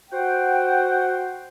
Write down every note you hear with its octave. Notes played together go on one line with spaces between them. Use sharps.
F#4 C5 F#5 G5